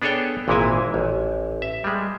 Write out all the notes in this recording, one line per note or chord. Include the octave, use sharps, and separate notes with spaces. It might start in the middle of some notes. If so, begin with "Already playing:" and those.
B3 D4 G#4 A4 C#5 G5
G#1 A#2 E3 G#3 E4 G#5
A1
E5
G3 G#3